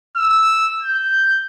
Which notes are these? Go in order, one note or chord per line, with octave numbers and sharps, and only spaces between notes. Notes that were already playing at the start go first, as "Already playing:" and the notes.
E6
G6